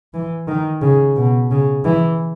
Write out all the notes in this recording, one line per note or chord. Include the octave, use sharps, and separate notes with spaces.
E3
D#3
C#3
B2
C#3
E3